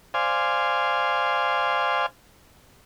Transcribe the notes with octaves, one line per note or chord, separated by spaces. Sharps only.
C5 D5 F5 G#5